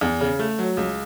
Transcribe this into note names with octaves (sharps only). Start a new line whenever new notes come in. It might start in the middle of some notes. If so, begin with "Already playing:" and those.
E2
C#3
A3
F#3
C#2